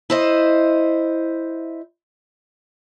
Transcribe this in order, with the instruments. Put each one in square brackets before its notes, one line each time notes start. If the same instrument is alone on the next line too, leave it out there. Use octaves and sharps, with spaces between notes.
[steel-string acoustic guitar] E4 C5 D#5